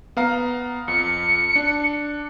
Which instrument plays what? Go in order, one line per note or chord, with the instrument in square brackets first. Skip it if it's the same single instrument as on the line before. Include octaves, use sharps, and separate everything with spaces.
[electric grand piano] B3 F5 A#5
[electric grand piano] F2 [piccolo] C#7
[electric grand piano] D4